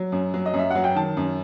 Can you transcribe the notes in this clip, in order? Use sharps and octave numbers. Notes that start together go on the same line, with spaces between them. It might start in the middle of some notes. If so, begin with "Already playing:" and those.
Already playing: F#3
F#2
F#3
D#5
F#2 E5
F#3 F#5
G5
D#3 A5
F#2